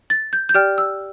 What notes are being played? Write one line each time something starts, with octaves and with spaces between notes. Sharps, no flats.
A6
G6
G6
G4 D5 G5 F6
E6